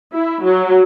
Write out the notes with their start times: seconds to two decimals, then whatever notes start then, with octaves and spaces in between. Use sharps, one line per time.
0.13 E4
0.43 F#3